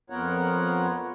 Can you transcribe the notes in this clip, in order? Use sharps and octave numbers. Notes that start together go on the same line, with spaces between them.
F2 B3 F4 A#4 C#5 F#5